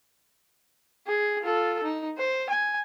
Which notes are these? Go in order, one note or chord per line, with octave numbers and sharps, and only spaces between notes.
G#4
F4 A4
D#4
C5
G#5